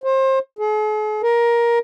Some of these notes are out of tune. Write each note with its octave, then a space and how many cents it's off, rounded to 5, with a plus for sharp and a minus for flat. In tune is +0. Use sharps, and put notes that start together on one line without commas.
C5 +30
G#4 +45
A#4 +15